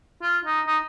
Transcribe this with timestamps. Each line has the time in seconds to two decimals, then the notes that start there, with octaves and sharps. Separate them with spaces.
0.22 F4
0.45 D#4
0.67 D#4